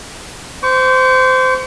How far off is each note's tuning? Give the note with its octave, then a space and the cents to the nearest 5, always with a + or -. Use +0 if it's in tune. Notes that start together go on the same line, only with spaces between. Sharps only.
C5 -20 C#6 +35